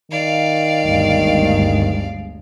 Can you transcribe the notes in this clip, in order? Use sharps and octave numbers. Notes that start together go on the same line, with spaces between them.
D#3 D5 F5
G1 D2 G#3